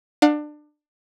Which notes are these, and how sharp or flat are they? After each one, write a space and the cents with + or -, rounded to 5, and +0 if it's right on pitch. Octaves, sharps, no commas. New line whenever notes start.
D4 +25 F#5 -45